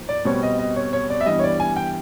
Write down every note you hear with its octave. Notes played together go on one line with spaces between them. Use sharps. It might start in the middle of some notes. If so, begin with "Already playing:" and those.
Already playing: G#2 F3 A#3
D5
B2 G3 C4 C#5
D#5
D#5
C#5
C#5
D5
E5
G2 E3 G3 B3 D#5
C#5
D5
G#5
G5